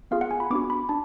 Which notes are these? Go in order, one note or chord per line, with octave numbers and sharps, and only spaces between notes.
B3 F4 G#4 F5
F#5
G#5
B5
B3 D4 F#4 D6
B5
D4 A5